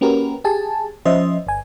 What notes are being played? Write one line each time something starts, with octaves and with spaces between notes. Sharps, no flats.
A#3 C#4 F#4 G4 A#4 B4
G4 G#4 G#5 A5
F3 C#4 C5 D#5 E5
G1 G#5